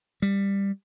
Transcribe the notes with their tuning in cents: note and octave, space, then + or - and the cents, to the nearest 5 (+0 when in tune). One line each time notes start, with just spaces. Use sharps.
G3 +15